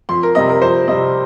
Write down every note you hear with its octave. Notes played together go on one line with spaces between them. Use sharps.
F2 C6
A#4
C3 G3 C4 D#5
A#4
F2 C5
C3 G3 C4 D#5